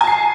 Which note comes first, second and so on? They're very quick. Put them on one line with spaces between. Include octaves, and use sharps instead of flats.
G#5 A5 C7